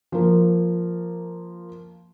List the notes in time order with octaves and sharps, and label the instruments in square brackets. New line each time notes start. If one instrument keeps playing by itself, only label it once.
[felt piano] F3 A#3